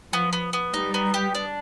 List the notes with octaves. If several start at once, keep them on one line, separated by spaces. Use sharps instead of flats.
F3 B3
B3
B3
G3 D#4
B3
G4
D4